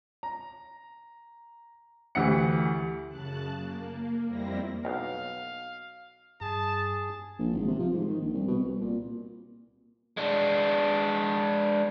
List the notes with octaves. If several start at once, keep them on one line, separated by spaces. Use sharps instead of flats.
A#5
D2 E3 G4 F#5 C#7
F#2 C#3 A5 F#6
A#3
F2 G3 A#3 C4 E4 A#6
B1 F5
G2 G#4 A5
A#1
G#1
C3
F3
G#2
D#3
A#1
C2
B2
C2
A#2
G#3 D4